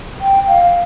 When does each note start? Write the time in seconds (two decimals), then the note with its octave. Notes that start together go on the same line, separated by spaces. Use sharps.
0.21 G5
0.48 F5